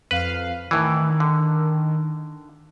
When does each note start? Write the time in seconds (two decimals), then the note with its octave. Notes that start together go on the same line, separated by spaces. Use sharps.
0.11 F2 B4 F5
0.71 A2 D#3 E3
1.20 D3